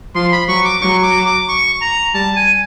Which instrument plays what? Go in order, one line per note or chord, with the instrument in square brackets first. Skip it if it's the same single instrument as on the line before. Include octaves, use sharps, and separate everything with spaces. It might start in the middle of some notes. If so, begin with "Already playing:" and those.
[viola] F3 [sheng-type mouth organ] C6
[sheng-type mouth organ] B5
[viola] F#3 [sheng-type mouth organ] C#6
[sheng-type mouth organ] D6
[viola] F#3 [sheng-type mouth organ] C#6
[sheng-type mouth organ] D6
D6
C#6
A#5
[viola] G3 [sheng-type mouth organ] A5
[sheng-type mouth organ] G#5